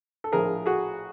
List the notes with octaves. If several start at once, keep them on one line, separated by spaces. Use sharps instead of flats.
A4
A#1 A2 F3 G#4 A#4
F#4 G#4